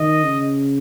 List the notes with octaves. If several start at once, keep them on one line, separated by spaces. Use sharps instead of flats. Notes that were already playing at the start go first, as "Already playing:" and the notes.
Already playing: D#3 D#5
C#3